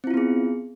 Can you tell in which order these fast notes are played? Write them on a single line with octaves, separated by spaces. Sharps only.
C4 E4 F4 B3 G#4